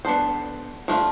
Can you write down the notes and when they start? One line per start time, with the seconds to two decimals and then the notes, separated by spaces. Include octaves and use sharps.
0.05 B3 D4 A4 C5
0.88 F3 A3 D4 F4